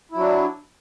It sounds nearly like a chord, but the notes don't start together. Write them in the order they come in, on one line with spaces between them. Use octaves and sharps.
E4 F#3 D4